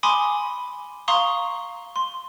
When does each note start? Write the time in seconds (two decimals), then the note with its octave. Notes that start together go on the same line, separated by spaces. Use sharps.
0.03 G#5 B5 C6 D6 D#6
1.08 F5 A#5 C6 C#6 D#6
1.96 C6